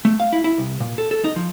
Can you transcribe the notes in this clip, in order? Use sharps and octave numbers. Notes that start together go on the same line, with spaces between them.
A3
F5
E4
E4
C2
A#2
A4
A4
D#4
F3